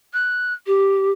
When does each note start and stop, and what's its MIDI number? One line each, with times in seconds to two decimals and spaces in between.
0.13 0.53 90
0.66 1.10 67